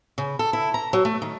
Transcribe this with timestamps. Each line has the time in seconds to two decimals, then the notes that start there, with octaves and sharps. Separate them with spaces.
0.18 C#3
0.39 A4
0.53 E4
0.74 A#5
0.93 F#3
1.05 A3
1.22 D#3